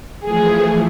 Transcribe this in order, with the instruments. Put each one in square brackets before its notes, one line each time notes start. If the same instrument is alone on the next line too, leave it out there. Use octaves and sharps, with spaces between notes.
[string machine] E3 F3 A3 [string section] G#4